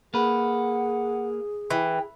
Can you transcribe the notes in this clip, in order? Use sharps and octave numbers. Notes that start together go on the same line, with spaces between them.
A#3 G#4 B4 F#5
E3 G5